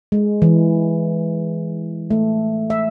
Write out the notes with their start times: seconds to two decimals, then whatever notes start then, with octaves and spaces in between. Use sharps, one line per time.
0.12 G#3
0.42 E3
2.11 A3
2.70 E5